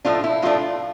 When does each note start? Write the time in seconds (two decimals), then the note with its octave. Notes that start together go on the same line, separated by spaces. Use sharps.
0.05 A2 F3 A3 D4 F4
0.24 E4
0.42 A2 F3 A3 D4 F4